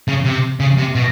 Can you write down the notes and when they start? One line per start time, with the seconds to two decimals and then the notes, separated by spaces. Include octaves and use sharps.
0.08 C#3
0.25 C3
0.60 C#3
0.78 C3
0.95 B2